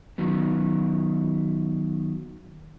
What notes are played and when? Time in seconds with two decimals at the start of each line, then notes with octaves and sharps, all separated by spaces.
0.18 D#3 F#3 B3